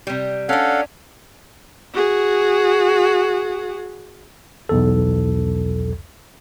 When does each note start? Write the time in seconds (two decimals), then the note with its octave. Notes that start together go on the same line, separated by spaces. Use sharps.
0.07 C3 G3
0.49 C#4 D4 A4 F5 F#5
1.94 F#4 G#4
4.69 B1 E2 A4